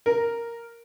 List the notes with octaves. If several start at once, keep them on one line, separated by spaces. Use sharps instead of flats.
A#4